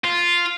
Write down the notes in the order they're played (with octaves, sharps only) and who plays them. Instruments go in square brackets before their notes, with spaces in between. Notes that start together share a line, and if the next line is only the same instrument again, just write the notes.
[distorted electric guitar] F4